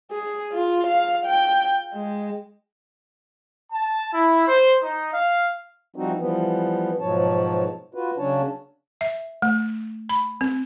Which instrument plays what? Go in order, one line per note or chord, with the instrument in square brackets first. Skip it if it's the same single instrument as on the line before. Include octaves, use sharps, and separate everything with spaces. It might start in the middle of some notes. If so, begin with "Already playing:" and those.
[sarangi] G#4
F4
F5
G5
G#3
[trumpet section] A5
E4
C5
D#4
F5
[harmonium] F3 G3 C4 D#4 F#4
E3 F3 G3 B3
G#2 B2 F3 F#3 C#5 A5
F4 F#4 B4
C#3 F#3 C#4 D4 C#5 A5
[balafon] E5
A3
B5
C4